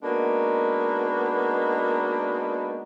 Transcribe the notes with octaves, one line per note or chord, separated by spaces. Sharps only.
G#3 A#3 B3 D4 D#4 F#4